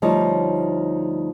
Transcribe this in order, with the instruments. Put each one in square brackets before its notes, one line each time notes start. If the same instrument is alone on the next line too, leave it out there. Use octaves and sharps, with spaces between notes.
[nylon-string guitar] D2 F3 G3 D#4 C5 C#5